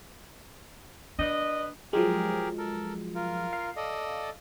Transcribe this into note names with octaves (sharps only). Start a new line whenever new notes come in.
D4 B4 D5 D#5
F3 F#3 G#3 G4 G#4 A#4
A4 A#4
F4 A#4
F5
A4 D5 D#5